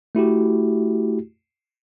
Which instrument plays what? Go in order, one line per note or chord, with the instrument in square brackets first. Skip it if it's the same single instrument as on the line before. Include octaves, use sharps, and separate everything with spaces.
[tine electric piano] A3 E4 F#4 G4